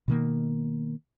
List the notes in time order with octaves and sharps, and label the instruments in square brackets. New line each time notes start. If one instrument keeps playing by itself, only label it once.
[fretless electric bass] B2 D#3 A#3